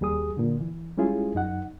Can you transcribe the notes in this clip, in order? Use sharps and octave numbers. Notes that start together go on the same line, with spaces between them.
D#2 G3 G#4 D#6
A#2 D3
E3
G3 G#3 C#4 E4 F4 G#4
F#2 D#4 F#5